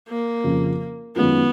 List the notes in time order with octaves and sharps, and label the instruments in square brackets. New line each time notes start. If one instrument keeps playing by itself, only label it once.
[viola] A#3
[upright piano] F2 C#3 F3
[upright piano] F#2 D#3 G#3 C#4 F4 [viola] B3